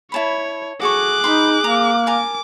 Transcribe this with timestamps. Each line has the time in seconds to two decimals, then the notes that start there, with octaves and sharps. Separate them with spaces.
0.12 E4 C#5 A5 B5
0.82 F#4 G#4 A4 C#6 D6 F#6
1.24 D#4 B4 B5 C6
1.64 A#3 A#5
2.06 A#4 G#5 A5 D6